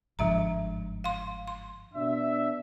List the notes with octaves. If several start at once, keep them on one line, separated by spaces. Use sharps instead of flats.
G1 G#2 D3 F3 E5 A#5
F5 C6
C6
B2 D4 E5